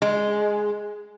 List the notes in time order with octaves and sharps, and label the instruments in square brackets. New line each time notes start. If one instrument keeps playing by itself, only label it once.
[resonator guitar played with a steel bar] G#3